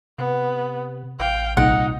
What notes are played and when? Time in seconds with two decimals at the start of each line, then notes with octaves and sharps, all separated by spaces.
0.18 C3 B3
1.19 A1 F5 G5
1.57 C2 A#2 D#4 F#5